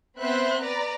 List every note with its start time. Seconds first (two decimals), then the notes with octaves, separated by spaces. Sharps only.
0.18 B3 C4 C5 E5 B5 F#6
0.61 B4 D5 A#5